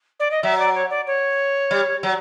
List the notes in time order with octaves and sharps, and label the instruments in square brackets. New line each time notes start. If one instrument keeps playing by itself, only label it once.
[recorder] D5
D#5
[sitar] F#3 [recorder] E5
[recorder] D5
C#5
D5
C#5
[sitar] G3
F#3